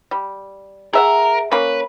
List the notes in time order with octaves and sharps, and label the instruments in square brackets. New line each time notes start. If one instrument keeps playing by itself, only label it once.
[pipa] G3
[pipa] G#4 E5 F#5 [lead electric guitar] A#4
[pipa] A#3 C#4 [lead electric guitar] B4